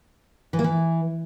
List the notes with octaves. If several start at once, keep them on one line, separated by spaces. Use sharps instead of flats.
E3
A#3
E3